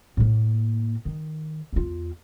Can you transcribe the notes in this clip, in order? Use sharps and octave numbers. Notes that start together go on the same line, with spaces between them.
A2 A#3
D#3
E2 F4